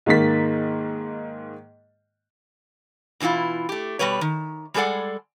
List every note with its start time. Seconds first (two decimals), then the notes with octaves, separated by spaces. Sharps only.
0.06 G#2 D#3 A#3 A6 B6
3.20 B2 E3 F#3 E4 F4
3.69 A3 G4
3.99 B2 E3 G3 B4 C#5
4.21 D#3
4.74 G3 G#3 G#4 A4 D5 F#5